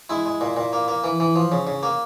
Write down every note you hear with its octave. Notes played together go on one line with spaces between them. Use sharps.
G#3 E4
G#3
A#2
A#2
A#3
A#3
E3
E3
F3
C#3
C#3
A#3